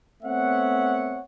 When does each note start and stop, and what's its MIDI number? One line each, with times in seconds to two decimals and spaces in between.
0.23 1.20 57
0.23 1.20 59
0.23 1.20 60
0.23 1.20 73
0.23 1.20 76
0.23 1.20 78